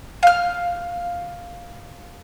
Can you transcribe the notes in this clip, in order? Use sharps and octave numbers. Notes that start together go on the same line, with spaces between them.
F5 F6